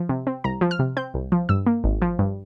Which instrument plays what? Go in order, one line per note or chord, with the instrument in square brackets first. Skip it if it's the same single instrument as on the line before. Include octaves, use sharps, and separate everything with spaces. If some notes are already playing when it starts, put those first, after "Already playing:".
Already playing: [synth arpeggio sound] F3
C3
C4
C2 A#5
F3
F6
C3
C4 G6
C2
F3
G2 E6
A#3
G#1
F3
G2